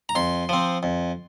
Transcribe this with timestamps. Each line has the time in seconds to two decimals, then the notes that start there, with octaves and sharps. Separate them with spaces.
0.09 A#5
0.15 F2 C6
0.49 F3 C4
0.83 F2